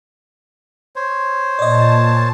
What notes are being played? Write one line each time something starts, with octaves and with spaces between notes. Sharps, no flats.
C5 C#5
A#2 D5 D#5 A5